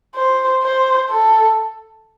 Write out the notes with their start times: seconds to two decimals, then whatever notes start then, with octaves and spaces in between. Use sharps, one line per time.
0.15 C5
0.63 C5
1.10 A4